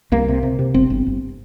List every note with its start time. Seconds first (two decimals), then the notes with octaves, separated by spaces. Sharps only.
0.12 C2 A#3
0.28 C3
0.43 C3
0.59 C3
0.74 G1 C4
0.90 G1
1.06 G1